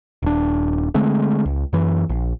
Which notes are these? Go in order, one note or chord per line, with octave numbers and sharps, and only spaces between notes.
D#1 D4
D3 G#3 A3 C4
C#2
F#2 E3
A#1